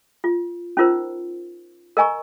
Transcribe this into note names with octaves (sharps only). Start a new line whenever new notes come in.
F4
C#4 D#4 F4 A#4 C5
A#4 D#5 G#5 A#5 C#6